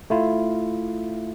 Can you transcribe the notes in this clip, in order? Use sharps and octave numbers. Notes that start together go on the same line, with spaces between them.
A3 E4 F4